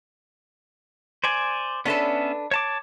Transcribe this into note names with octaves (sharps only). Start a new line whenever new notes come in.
C5 D5 G#5
B3 C#4 D4 A4 B4 E5
C#5 A5 D6